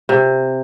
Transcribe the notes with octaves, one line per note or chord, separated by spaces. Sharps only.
C3